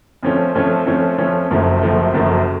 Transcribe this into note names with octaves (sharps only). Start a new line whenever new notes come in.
F2 F3 A3 C#4
F2 F3 A3 C#4
F2 F3 A3 C#4
F2 F3 A3 C#4
F#1 F#2 F3 A3
F#1 F#2 F3 A3
F#1 F#2 F3 A3